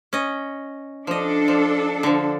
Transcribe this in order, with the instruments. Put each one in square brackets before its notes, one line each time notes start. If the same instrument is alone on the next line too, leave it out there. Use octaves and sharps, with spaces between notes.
[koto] C#4 D#5
[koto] F3 D#5 [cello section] D4 A4
[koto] F3
D3 F3